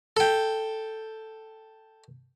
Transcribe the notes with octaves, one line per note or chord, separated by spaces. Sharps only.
A4 G5